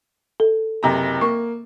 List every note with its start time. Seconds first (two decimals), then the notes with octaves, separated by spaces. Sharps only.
0.40 A4
0.83 F#1 C3 A#5
1.21 A#3 C#6